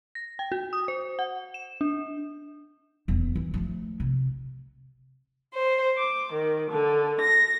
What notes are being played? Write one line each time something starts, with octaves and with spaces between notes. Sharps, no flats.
A#6
G5
F#4
D#6
C5
F#5
E7
D4
D#1 E2
E3
F3 A3
C3
C5
D6
D#3
D3
A#6